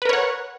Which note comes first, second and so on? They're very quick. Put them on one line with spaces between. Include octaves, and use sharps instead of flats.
B4 A#4 C#5 F#5